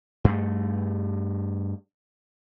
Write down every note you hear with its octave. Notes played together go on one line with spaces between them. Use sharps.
G2 A3